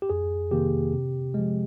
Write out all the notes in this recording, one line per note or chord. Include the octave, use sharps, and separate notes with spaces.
G4
F2 G#4
C3 D#3 A#3 G4
C3
F3 G#3